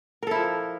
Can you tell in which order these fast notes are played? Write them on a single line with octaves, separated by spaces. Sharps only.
A#4 A4 E4 F3